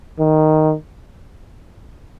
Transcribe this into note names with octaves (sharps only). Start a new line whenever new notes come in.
D#3